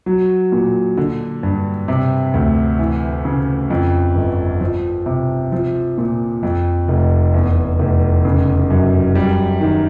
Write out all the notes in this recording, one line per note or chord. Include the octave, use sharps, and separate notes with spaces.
F#3
A#2
D3
G2
C3
D2
E3
C#3
F2
G1
F3
C3
F3
A#2
F2
F1
E2
F1
C#3
F#2
G3
D#3